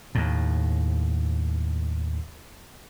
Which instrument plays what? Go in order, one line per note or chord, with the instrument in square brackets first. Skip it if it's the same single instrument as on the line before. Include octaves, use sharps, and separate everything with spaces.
[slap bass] D#2 A2